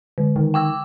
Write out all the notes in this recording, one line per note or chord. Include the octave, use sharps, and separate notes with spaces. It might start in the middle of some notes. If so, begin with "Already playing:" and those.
D3
D#3
G5 D6 E6